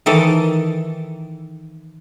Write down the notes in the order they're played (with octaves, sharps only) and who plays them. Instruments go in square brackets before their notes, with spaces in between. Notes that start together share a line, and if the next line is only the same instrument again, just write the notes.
[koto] D#3 E3 A4